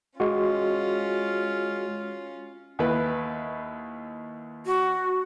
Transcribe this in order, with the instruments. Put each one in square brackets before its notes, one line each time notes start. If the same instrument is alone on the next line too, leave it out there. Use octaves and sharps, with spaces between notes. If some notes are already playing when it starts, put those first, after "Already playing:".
[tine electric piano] G#3 F#4 [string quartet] C#4 F4
[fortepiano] D#2 E4 B4
[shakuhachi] F#4